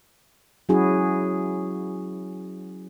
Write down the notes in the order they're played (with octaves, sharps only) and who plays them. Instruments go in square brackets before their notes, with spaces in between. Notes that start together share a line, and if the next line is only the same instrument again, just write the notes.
[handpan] F#3 C#4 E4 F#4 G#4